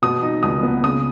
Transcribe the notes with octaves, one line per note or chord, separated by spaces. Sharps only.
B2 D#6
D#4
C#2 D#6
B3
C#3 D#6